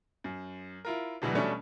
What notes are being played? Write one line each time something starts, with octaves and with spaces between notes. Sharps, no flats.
F#2
E4 F4 A#4
D2 B2 E3 F#3 G3
B2 G3 A3 C#4 D4